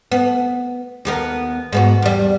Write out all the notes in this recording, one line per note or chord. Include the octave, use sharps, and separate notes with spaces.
B3
D#2 B3 A#4
G#2 B3 F#4
E2 G3